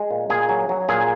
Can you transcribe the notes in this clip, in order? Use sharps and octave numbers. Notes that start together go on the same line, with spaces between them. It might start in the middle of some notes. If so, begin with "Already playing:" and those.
Already playing: G#3 G#4
A#2
A#2 G#4
F#3
F#3
A#2 G#4